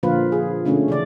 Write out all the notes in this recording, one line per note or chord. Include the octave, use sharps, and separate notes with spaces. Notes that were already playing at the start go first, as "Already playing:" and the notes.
A#2 D3 F3 A#3 F4 B4
G#4
B2 D3 A3 C#4
C#3 E3 D5